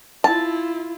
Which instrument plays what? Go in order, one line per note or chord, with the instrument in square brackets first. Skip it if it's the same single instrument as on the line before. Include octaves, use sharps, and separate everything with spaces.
[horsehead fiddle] E4 F4 [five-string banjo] A5